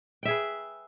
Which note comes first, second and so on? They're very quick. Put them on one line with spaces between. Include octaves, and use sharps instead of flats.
G5 E5 G#4 B4